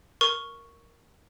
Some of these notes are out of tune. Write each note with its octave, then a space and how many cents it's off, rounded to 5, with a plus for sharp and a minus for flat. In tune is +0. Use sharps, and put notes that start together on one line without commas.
A#4 +0 C#6 +0